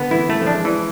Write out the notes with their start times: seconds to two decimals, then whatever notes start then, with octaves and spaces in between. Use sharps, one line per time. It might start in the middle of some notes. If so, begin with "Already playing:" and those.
Already playing: D3 B3
0.11 E3 E4
0.29 E3 A3
0.41 F3
0.47 D4
0.53 G#3
0.65 E3 F3